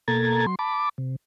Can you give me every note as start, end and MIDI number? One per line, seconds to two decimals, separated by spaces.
0.08 0.46 47
0.08 0.46 58
0.08 0.46 69
0.08 0.46 82
0.08 0.46 92
0.08 0.46 93
0.46 0.55 54
0.46 0.55 84
0.59 0.89 81
0.59 0.89 83
0.59 0.89 86
0.98 1.16 48